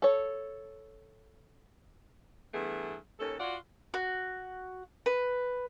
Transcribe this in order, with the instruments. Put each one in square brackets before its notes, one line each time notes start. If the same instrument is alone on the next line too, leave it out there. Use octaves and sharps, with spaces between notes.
[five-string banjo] A4 C#5
[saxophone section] G2 E3 A3 B3 G#4
D#2 C#4 A4
F4 F#4 D5 F#5
[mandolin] F#4
B4